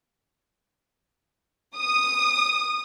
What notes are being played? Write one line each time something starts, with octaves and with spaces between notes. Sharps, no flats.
D#6